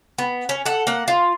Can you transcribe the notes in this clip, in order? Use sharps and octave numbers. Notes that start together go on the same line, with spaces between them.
B3
C#4
A4 F#5
A#3 F#5
F4